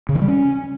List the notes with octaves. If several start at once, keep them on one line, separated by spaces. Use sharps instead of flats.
C#3
D#3
G3
C#4